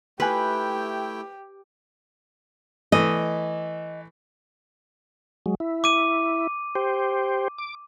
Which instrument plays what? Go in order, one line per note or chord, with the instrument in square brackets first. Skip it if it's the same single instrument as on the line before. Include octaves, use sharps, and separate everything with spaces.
[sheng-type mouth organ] A3 E4 G5 [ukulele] F4 G#5 [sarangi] G4 [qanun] B4
[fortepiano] E3 A3 [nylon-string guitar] D#5
[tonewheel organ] F#3 G#3
E4
[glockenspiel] D6 D#7
[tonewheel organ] G4 C5
D6